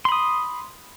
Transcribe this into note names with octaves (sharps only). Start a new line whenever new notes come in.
B5 C6 D#6